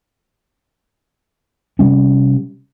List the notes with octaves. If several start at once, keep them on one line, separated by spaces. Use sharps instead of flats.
C3 G3 C#4